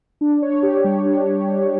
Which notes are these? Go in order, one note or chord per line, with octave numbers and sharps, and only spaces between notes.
D4
C#5
G4
G3
D4